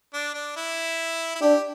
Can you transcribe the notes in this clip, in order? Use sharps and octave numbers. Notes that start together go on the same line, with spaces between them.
D4
D4
E4
E4
D4 G4